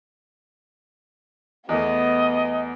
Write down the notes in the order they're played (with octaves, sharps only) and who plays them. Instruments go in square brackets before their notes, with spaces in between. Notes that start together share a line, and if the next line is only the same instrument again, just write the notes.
[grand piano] E2 A3 [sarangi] B3 [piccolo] D#5